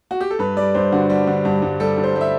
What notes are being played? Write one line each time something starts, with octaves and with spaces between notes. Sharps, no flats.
F#4
G4
A4
G2 B4
G3 D5
G2 C5
D3 F#4
G3
D3
G2
G2
G3 A4
G2
C5
G3
E5